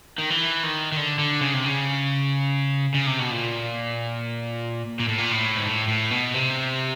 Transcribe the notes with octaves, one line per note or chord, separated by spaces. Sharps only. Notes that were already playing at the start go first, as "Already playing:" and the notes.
D#3
E3
D#3
D#3
D3
D3
C#3
C3
C#3
C#3
C3
B2
A#2
A#2
A2
A#2
A2
G#2
A2
A2
B2
C3